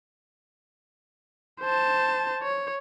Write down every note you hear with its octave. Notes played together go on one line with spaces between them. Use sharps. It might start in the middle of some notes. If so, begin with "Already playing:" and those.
C5 A5
C#5